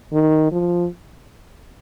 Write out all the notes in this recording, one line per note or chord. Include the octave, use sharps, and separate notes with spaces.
D#3
F3